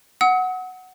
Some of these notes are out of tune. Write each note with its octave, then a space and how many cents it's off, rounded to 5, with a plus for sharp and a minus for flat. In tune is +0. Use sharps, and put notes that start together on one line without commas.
F#5 +0 D#6 +45